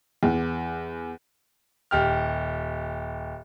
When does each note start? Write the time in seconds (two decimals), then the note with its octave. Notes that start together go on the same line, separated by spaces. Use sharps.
0.23 E2
1.91 D#1 G4 F6